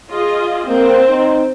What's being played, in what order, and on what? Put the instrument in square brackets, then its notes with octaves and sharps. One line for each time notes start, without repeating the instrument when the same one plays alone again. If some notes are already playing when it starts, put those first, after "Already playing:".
[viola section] F4 G#4 D#5
[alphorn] A#3 [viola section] C4
[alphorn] D#4